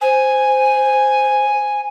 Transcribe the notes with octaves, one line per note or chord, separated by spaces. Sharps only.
C5 G#5